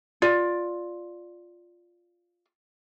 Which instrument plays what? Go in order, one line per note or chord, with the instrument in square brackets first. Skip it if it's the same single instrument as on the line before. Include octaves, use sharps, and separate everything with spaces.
[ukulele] F4 D5